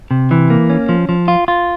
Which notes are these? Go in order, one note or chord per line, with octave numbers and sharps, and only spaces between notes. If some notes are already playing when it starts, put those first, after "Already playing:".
C3
E3
A#3
C#4
F3
F3
F4
F4